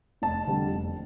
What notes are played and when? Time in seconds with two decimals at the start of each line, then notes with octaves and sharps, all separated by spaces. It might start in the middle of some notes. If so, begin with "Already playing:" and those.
0.22 F1 A5
0.47 F2 D3 G3
0.72 F1